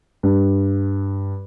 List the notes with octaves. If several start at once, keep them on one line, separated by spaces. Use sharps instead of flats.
G2